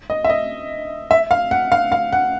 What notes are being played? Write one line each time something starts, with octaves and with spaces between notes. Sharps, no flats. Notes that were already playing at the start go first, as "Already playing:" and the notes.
D#5
E5
D#5
E5
F5
F#5
F5
F5
F#5